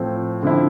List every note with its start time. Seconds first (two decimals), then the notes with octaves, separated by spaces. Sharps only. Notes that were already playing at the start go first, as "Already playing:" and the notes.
Already playing: A2 F3 C4
0.43 D3 F3 C4 E4